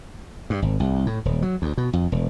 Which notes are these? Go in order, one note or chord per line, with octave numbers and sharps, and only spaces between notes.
G2
G#1
C2
A2
D#1
F#3
D2
B2
F2
E1